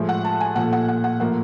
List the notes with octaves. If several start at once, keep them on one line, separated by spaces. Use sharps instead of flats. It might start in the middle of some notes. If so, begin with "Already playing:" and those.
Already playing: A2 F3 G#3
F#5
A5
G#5
A#2 F3 A3 F#5
F#5
F#5
F#5
A2 F3 A#3 F#5